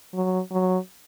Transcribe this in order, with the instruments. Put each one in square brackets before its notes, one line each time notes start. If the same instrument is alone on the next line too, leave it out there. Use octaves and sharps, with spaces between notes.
[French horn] F#3
F#3